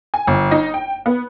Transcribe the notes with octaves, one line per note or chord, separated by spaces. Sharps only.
G#5
G1
D#4
G5
B3